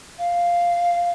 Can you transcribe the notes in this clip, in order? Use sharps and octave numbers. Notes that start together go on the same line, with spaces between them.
F5